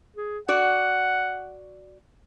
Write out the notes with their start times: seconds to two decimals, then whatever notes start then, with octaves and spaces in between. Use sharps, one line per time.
0.17 G#4
0.48 F#4 D5 F#5